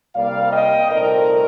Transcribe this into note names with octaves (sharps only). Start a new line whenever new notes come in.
C2 C3 G3 A#3 D5 F5
D#5 G5
C2 A#2 A3 C4 D#4 A#4 D5